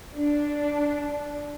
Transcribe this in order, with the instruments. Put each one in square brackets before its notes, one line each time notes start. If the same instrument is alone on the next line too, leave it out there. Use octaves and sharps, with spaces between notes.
[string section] D4